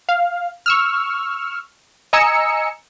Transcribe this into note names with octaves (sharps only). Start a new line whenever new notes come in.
F5
C#6 E6 F6
D#5 G#5 A#5 E6 C#7